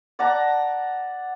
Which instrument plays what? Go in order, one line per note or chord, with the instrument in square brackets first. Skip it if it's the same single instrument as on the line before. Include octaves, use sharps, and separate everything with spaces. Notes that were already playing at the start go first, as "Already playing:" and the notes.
[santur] D5 F#5 A5 A#5